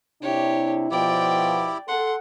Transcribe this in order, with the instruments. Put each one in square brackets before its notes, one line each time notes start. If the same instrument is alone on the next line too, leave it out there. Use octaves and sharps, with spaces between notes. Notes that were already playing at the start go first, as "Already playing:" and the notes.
[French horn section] C3 D4 E4 [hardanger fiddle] G4 C#5
[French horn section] B2 F3 [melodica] E4 G4 [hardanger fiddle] D5 G5
[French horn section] A4 [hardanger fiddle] F#5 [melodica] C6